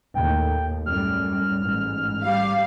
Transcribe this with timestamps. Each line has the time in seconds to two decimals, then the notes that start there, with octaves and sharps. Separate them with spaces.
0.15 D#2 A2 G5
0.86 F#2 A2 G3 F6
1.57 A1 G#2
2.23 G3 F5